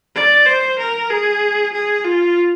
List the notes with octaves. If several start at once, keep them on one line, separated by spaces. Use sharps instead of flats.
D5
C5
A#4
G#4
G#4
F4